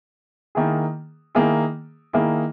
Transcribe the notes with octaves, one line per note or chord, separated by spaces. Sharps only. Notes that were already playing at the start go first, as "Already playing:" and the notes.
D#3 A#3 E4 G#4
D#3 A#3 E4 G#4
D#3 A#3 E4 G#4